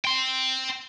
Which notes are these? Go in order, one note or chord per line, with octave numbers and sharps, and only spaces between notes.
G5 C6